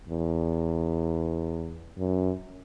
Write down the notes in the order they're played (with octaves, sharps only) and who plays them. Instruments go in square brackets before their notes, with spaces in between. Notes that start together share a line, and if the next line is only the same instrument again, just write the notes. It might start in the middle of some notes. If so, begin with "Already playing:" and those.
[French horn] E2
F#2